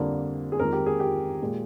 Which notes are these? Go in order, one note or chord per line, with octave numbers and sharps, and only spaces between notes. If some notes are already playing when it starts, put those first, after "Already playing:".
Already playing: F2 D3 G3 A#3
G#4
F2 D#3 G#3 A#4
G4
G#4
G4
A#2 G#3